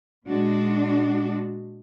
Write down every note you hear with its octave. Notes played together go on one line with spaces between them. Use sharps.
A#2 G#3 D4 F#4